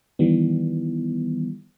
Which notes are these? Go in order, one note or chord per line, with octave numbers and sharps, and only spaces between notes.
D#3 E3 G3 B3